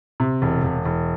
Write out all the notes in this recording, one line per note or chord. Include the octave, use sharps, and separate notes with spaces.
C3
E1
E1
E1